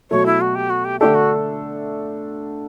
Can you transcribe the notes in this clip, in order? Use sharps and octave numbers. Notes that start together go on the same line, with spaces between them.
B2 F#3 A3 C#5
E4
F#4
G4
F#4
G4
D3 A3 D4 G4 A4
F#4